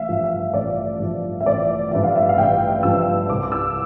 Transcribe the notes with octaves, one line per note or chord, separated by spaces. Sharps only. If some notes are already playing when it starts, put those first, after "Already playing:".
Already playing: A1 E5 F5
G2 F3
E5
A1 D5
G2 F3
E5
A1 D5
G2 F3 E5
F5
E5
F5
A1 G5
G2 F3 E6
C2 D6
D6
E6